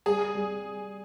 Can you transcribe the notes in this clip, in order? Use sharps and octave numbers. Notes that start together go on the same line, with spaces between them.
G3 G#4
G3